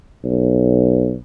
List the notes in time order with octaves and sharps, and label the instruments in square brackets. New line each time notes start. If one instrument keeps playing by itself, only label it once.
[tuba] B1